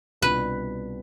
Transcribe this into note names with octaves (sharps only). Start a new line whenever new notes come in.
C2 B2 G3 D4 F4 B4